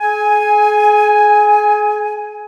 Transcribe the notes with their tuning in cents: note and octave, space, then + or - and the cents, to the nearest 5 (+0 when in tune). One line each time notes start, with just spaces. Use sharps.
G#4 +35 G#5 +0